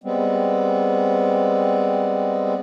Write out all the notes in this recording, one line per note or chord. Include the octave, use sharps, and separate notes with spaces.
G3 G#3 B3 C4